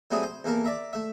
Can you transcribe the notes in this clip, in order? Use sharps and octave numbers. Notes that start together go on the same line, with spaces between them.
F#3 G3 A3 C4 G#4
C5
E2 A#3 A4 A#4
D5 E5 A#5
A3 E5